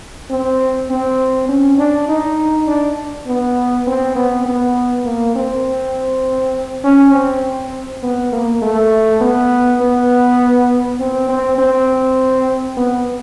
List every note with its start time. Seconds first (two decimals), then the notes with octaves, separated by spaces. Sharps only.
0.30 C4
0.90 C4
1.49 C#4
1.78 D4
2.09 D#4
2.67 D4
3.27 B3
3.87 C4
4.16 B3
4.45 B3
5.05 A#3
5.36 C4
6.84 C#4
7.13 C4
8.03 B3
8.32 A#3
8.62 A3
9.21 B3
9.81 B3
11.00 C4
11.29 C4
11.58 C4
12.77 B3